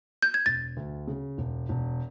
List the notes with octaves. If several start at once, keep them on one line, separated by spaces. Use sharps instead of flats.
G6
G#6
E1 A6
D2
C#3
E1
E1